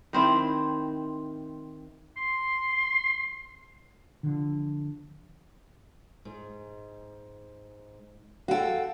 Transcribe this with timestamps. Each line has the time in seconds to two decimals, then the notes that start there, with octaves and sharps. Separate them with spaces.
0.13 D#3 C4 E4
2.17 C6
4.23 D3 F3
6.25 G#2
8.48 F#4 A4 F5 G5